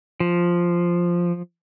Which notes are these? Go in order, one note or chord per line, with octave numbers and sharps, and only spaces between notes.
F3